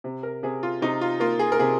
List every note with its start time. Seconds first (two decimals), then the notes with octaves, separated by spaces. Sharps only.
0.04 C3
0.23 A#4
0.43 C3 G#4
0.63 F4
0.82 C3 D#4
1.01 F4
1.20 A#3 F4
1.39 G#4
1.52 A#4
1.59 C3 G#4